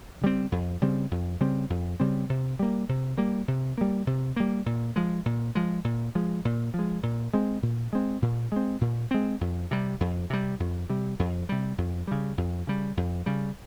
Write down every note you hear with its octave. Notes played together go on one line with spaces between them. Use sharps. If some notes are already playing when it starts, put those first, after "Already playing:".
C#3 G3 C4
F2
C#3 G3 C4
F2
C#3 G3 C4
F2
C#3 G3 C4
C3
G3 A#3
C3
G3 A#3
C3
G3 A#3
C3
G3 A#3
A#2
F3 G#3
A#2
F3 G#3
A#2
F3 G#3
A#2
F3
G#3
A#2
G#3 C4
A#2
G#3 C4
A#2
G#3 C4
A#2
G#3 C4
F2
C3 G3
F2
C3 G3
F2
C3 G3
F2
C3 G3
F2
C#3 G3
F2
C#3 G3
F2
C#3 G3